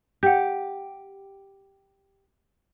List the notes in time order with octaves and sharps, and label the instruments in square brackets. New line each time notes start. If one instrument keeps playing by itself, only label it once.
[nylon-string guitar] G4 [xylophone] F#5 G6